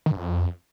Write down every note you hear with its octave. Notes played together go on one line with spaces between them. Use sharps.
D#3
G2
F2